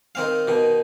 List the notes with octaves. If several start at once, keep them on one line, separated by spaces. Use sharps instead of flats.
D#3 C4 F5
B2 D#3